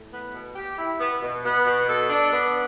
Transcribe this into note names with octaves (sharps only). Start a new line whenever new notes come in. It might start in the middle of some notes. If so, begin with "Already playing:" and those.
Already playing: A2
B3
B2
G4
E4
B3
B2
B3
B2
A4
D4
B3